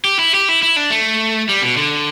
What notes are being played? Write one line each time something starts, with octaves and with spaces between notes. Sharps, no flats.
G4
E4
G4
E4
E4
D4
A3
G3
B2
D3